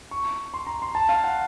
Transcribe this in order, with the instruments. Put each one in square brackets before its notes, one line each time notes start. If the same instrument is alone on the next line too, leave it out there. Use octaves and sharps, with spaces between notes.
[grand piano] C#6
C6
A#5
C6
A5
F5
F#5